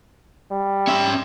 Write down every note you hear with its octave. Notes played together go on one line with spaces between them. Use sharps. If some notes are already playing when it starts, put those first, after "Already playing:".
G3
C#4 E5